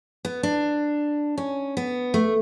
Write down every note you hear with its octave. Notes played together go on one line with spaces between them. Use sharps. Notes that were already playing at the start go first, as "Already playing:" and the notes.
B3
D4
C#4
B3
A3